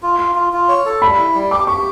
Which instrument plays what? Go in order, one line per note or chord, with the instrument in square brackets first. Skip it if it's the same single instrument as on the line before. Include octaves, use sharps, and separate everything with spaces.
[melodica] F4
F4
F4
F4
C#5
A4
[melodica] G3 [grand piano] B5
[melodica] E4
G3
[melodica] G4 [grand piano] D6
[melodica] G4 [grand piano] C#6